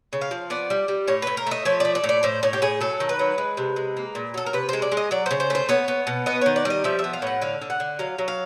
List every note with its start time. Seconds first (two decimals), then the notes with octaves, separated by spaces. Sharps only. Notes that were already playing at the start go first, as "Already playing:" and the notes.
0.13 C#3
0.21 F5
0.31 F3
0.50 B3 D5
0.70 G3
0.88 G3
1.07 A2 C#5
1.22 A2 B4
1.37 A#4
1.47 A3 D#5
1.65 F3 C#5
1.80 A3 D5
1.95 D5
2.04 A2
2.09 D5
2.23 A2 C5
2.43 A2 C#5
2.53 G4
2.62 A2 G#4
2.81 F#3 A4
3.00 D#3
3.09 B4
3.19 F#3
3.38 G#3
3.57 C3
3.76 G#3
3.97 A#3
4.15 A#2
4.34 F#3 A4
4.46 A#4
4.53 C3 B4
4.69 G#3 C5
4.82 D5
4.92 G#3
4.97 D#5
5.11 F#3 D5
5.26 C#3 C5
5.40 C5
5.50 A3 C5
5.69 B3 C#5
5.88 B3
6.07 B2
6.26 B3 D#5
6.41 D#3 C#5
6.56 D5
6.65 G3
6.70 D#5
6.84 F3 E5
6.99 E5
7.04 B3
7.13 F5
7.22 A2 F#5
7.41 D3 F5
7.61 D3
7.70 F#5
7.80 D3
7.99 F#3 F5
8.18 F#3
8.28 F5